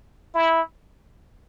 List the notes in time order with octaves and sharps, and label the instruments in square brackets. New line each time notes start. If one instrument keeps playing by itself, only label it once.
[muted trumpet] E4